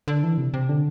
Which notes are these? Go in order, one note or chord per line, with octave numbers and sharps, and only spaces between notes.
D3
E3
C3
C3
D3